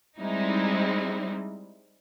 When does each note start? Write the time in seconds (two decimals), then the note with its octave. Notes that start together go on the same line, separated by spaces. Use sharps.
0.18 G3 G#3 C4 D#4 E4